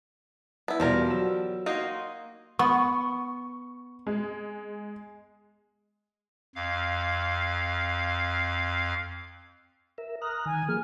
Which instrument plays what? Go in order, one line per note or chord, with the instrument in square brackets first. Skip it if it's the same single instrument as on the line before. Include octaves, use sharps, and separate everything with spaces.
[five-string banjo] B3 E4
[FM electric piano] E2 B2 [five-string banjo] F3 G3 A#4
[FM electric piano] F#3 E6
[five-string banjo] A#3 D#4 F#4 [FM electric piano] C6 D#6
[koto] B3 [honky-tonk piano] C#6
[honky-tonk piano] G#3
[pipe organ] F2 F5
[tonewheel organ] A#4 E5
[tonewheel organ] A#5 F6 F#6 [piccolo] D#6
[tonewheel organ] D#3 [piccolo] G#5
[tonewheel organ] F3 A#3 G#4 [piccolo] F6